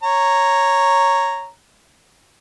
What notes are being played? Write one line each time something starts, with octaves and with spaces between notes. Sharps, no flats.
C#5 A#5